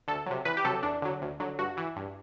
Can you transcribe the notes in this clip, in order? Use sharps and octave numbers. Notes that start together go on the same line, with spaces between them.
D2 A4
C3 F#3
E2 B4
G4
C3 F#3 A4
E2 D4
D3 F#3
D2
D3 F#3
G2 F#4
E3
G2